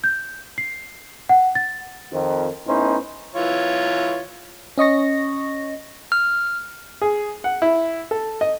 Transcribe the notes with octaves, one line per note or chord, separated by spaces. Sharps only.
G6
C7
F#5
A6
F2 D#3
A2 B3 C#4 D#4 C5
E3 F4 C#5
C#4 D#5 C#6 A#6
F6
G#4
F#5
E4
A4
D#5